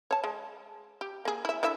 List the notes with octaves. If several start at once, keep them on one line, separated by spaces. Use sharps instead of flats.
C#5 A5
G#3
G4
A#3 G#4
E4 E5
D3 E4 E5